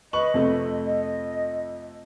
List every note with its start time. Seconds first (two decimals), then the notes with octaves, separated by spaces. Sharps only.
0.13 B4 D#5 C#6 F#7
0.34 F2 C3 A3
0.85 D#5